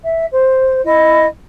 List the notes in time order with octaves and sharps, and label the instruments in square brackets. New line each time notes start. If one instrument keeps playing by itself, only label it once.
[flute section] E5
C5
E4 D#5